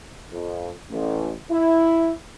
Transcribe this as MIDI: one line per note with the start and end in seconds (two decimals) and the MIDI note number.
0.32 0.71 41
0.90 1.35 33
1.51 2.11 64